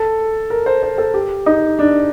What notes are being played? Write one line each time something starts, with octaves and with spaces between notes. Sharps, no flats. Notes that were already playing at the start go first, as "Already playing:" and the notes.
Already playing: A4
A#4
C5
C5
A4
G4
D#4
D4